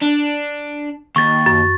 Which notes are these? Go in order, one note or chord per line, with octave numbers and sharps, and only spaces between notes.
D4
D#2 C#6 A6
F#2 A6